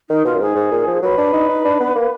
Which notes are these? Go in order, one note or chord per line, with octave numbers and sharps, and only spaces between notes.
D#3 D#4
B2 F4
F#2
G#2 G#4
G#2
A#2
F3
F#3 B4
D4
D#4
D#4
D4
B3
A#3